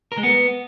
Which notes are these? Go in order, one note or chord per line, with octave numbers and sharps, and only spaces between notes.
A#4
G#3
B3